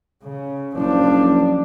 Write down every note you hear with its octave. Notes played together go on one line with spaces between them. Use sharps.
C#3
F#1 F3 D4